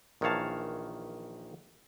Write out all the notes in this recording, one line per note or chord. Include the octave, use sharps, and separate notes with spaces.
A#1 D#3 E3 C#5 F5 A5